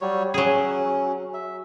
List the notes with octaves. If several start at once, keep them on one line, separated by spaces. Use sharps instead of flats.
F#3 G3 C#5
F#3 C#4 G#4
E5